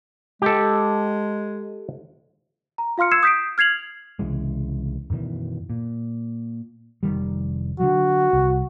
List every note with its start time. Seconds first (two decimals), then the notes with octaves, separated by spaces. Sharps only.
0.42 G#3 G4 A4
2.78 A#5
2.98 F4 F5 C6 F6 C#7
3.11 E6 G#6 C7 C#7 E7
3.23 D#6 G6 B6 C7 D7
3.58 F6 G#6 C7 F7 F#7
4.19 C2 C#3 E3 G#3
5.10 F#2 B2 D#3 E3
5.70 A#2
7.03 F1 D#3 G3
7.80 D3 D#3 F#3 F#4
8.33 C2